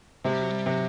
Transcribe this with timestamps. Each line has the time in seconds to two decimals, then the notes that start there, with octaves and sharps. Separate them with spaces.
0.25 C3 G#3
0.33 G3
0.42 F#3
0.50 G3
0.66 C3 F#3